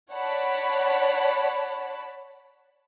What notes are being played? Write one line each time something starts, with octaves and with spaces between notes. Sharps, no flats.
C#5 D5 F#5 A5 B5